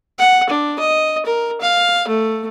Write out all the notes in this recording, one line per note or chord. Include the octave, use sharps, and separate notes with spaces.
F#5
D4
D#5
A#4
F5
A3